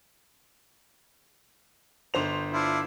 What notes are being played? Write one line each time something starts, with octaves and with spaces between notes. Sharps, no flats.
G1 C5 F7
D4 E4 F4